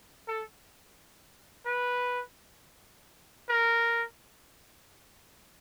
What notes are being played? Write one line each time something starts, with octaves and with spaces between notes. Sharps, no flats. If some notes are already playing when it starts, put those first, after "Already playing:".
A4
B4
A#4